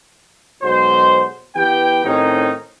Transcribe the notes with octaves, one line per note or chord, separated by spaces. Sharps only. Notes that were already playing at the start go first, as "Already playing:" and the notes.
B1 G#3 F#4 C5
E3 B3 G4 G5
A2 D#3 C4 C#4 D#4